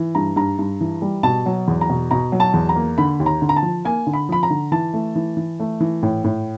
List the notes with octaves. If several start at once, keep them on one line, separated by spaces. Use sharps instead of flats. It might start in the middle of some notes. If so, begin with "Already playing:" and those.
Already playing: E3
G2 A#5
G2 A#5
G2
E3
G3
B2 A5
F#3
E2
A#5
B2
B2 A#5
F#3
A5
E2
A#5
A#3
D3 B5
D#2
A#5
D3
A#5
A5
F3
A#3 G#5
D3
B5
F3 B5
A#5
D3
E3 A5
A3
E3
E3
A3
E3
A2
A2